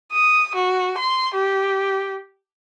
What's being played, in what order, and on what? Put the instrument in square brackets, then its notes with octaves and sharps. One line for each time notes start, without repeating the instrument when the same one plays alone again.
[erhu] D#6
F#4
C6
G4